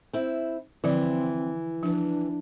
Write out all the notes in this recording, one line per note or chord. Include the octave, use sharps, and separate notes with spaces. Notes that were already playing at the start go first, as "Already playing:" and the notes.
C4 E4
D3 E3 F3 C4 D5
F3 D4 B4